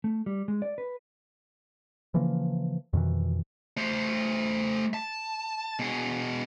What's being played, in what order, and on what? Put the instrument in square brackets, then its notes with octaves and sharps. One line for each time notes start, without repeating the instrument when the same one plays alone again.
[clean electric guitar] A3
G3
G#3
D5
B4
[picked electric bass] C#3 E3 F3 A#3
F2 B2 D#3 E3
[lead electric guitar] A3 C5
A5
B2 G#4